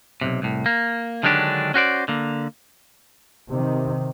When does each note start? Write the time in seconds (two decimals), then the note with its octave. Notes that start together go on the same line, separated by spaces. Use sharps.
0.21 B1 G#2 C3
0.42 C2 A2
0.66 A#3
1.23 D3 D#3 F#3 G#3 D4 G4
1.74 C#4 F#4 C5 D5
2.08 D3 A#3
3.50 C3 D#3